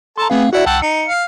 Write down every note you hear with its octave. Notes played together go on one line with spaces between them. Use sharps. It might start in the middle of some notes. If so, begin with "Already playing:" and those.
A4 A5 A#5 C6
A3 B3 C4 G#4 F5
E4 F#4 D5 E5 F#5
C2 F#5 G5 A5 E6
D#4 C#7
F5